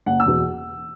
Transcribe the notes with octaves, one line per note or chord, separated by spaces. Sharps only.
F#1 F#5
E6
E2 B2